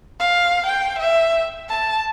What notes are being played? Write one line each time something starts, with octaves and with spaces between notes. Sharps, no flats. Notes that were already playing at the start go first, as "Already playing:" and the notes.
F5
G5
E5
A5